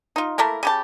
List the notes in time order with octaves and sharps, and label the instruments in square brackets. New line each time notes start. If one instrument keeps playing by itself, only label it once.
[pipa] D#4 F4
A3 A#3 E4 A#4
C#3 G4 A5